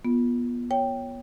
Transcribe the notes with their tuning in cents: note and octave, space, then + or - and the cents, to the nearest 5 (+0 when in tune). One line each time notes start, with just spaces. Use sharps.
B3 -25 F4 +0
C#5 +0 G5 +0